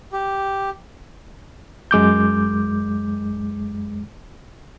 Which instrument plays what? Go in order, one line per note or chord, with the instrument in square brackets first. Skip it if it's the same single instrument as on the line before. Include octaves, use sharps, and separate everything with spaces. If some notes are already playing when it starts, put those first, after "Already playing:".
[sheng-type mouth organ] G4
[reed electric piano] F#2 G#3 D6 G6